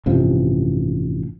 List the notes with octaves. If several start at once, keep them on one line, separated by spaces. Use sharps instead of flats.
A1 G2 C3 F3